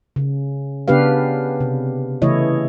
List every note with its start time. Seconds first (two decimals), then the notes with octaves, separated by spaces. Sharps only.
0.16 C#3
0.88 C#3 B3 D4 G4 B4 F5
1.60 C3
2.22 C#3 E3 A3 E4 C#5 D#5